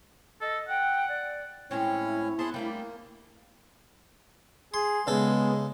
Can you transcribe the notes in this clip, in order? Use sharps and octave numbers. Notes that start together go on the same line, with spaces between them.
A4 D#5
F#5 G5
D5
A2 G#3 C4 C#4 E4 C#5
B3 G#4 C5 A5 C6
G3 A3 A#3 D4
G#4 C6
C#3 G#3 B3 A4